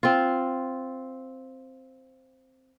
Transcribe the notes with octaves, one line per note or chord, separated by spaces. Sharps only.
C4 F4